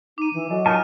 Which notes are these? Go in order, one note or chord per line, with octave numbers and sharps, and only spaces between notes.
D#4 D6 D#7
E3
F#3 A4 D#5 G#5
D#4 F4 A#4 F5 G#5 A5 F6 D#7